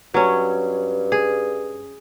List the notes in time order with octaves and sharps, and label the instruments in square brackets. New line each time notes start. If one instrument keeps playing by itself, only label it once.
[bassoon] G2 [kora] F#3 C#4
[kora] G#4